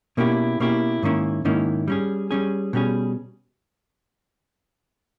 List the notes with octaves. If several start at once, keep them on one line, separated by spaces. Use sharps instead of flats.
B2 A#3 C#4 E4 G4
B2 A#3 C#4 E4 G4
G#2 D#3 A#3 C#4 E4
G#2 D#3 A#3 C#4 E4
G3 C#4 G#4
G3 C#4 G#4
B2 G3 C#4 G#4